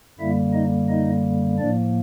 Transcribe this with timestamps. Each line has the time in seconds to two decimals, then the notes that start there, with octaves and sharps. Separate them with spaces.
0.19 F#2 D3 G3 A#3 E4 E5
0.54 D#4 D#5
0.89 D#4 D#5
1.59 A2 F3 A#3 D4 D5